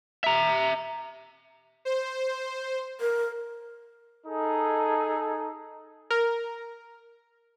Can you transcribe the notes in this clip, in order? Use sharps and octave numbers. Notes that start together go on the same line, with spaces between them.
E5 A#5
C5
A#4
D#4 G#4 A4
A#4